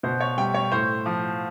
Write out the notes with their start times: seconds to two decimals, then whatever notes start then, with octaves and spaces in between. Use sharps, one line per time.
0.03 B2 C5
0.20 C#5
0.37 G3 G5
0.54 C#5
0.72 A2 C5
1.06 F3